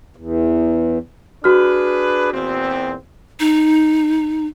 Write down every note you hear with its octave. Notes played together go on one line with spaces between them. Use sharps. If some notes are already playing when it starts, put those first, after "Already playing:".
E2
D4 F#4 G#4 B4 F6
E2 A#2 C4
D#4